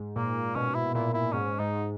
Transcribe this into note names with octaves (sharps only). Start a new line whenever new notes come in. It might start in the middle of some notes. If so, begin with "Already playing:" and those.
Already playing: G#2
A#2 A#3
B2 C#4
E4
A#2 E4
E4
G#2 C#4
G#2 D#4